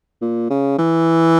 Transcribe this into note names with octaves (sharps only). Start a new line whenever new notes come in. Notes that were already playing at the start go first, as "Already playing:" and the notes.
A#2
C#3
E3